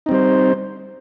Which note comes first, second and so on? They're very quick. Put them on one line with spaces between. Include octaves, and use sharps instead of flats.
D#4 C4 G3 C5